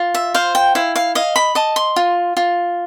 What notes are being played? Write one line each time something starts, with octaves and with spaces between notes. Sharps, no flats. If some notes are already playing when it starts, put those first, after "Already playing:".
Already playing: F4
E5
C5 F5
G5
E4 F5
F5
D#5 F5
B5
D#5 A5
C6
F4
F4